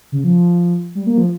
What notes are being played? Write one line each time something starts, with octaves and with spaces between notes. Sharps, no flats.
C#3
F3
G3
A#3
F3